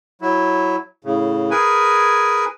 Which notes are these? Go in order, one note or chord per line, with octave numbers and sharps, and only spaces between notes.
F#3 E4
A2 C#3
G#4 A#4 B4 G#5